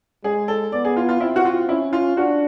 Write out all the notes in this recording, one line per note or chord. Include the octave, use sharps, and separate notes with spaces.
G#3 G#4
A4
B3 D5
G#4
F4
F4
C4 E4
F#4
F4
C#4 E4
F4
D4 F#4